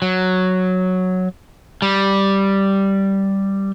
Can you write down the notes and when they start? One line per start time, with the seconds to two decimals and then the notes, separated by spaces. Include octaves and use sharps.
0.02 F#3
1.82 G3